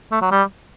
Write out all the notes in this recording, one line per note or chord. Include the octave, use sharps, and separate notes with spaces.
A3
F#3
G3